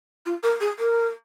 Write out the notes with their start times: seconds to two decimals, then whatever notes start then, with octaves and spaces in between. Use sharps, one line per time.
0.25 F4
0.43 A#4
0.60 G#4
0.78 A#4